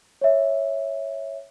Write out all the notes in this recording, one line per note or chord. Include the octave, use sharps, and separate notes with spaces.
C#5 E5